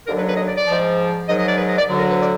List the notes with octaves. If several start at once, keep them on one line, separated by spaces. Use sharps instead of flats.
D#2 D3 F#3 A#4
B4
B4
D#5
D5
D5
G#2 F3
G#2 D#3 F#3 D#5
D#5
D5
B4
D#5
D5
D2 D3 F#3
A#4
B4
D5